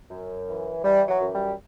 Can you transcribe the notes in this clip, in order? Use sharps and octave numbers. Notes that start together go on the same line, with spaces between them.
F#2
E3
E3 G3
F#3
F#2
G3